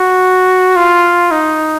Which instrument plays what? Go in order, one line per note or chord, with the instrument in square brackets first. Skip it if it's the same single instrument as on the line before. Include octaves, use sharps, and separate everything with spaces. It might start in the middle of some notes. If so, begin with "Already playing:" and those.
Already playing: [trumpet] F#4
F4
D#4